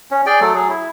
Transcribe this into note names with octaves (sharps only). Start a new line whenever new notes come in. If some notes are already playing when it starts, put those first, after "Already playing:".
C#4
G#4 D5 G5
F#3 A3 A4
F#3 G#4
E4